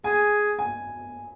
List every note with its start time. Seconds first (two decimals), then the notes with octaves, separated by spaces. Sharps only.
0.04 G#4 G#5
0.59 G#5